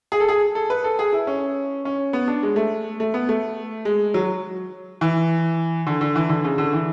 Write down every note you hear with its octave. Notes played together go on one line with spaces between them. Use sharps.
G#4
A4
G#4
A4
B4
A4
G#4
E4
C#4
C#4
B3
D4
G#3
A3
A3
B3
A3
G#3
F#3
E3
D3
D3
E3
D3
C#3
D3
E3